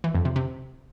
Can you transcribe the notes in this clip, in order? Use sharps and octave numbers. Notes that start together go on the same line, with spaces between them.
E3
F2
C3
C3